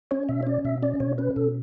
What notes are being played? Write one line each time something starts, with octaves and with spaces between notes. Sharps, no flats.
C#4 C#5
B2 E5
C#5
C#4 D5
B2 E5
C#4 D5
B2 C#5
C#4 B4
B2 A4